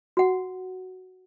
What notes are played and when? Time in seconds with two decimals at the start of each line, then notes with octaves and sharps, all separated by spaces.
0.17 F#4 F#5